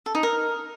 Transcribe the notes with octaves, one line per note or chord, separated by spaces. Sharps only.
A4
D#4
A#4